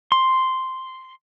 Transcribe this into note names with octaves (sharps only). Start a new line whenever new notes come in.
C6